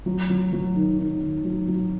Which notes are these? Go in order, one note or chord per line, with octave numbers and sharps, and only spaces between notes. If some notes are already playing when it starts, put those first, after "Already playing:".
F#3
F#3
F#3
D#3
D#3
D#3
F#3
F#3